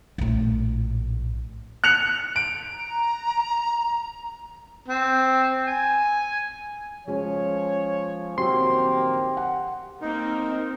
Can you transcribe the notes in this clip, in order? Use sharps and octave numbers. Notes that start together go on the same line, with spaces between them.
A#1 A2
F#6 C#7 F7
D7
A#5
C4
G#5
F3 G#3 C#4 C#5
A#1 D#3 F#3 A#3 C4 G4 C6
F#5
A#3 C4 D#4 A#4